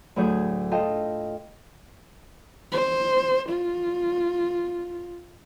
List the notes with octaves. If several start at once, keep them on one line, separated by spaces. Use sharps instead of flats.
D2 A2 F#3 G#4 C#5 G6
F4 A4 D#5 F5 G5
C5
F4